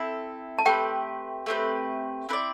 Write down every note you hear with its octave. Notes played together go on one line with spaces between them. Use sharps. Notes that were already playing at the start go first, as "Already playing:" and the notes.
Already playing: C4 E4 A4
A5
A3 C4 G4 B4 G5
A3 C4 G4 B4
C4 E4 B4 D5